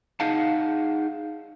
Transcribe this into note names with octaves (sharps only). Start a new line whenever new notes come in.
D#4 G#4 F5 F#5 A5